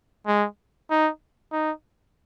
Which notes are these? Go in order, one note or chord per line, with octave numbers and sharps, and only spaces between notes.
G#3
D#4
D#4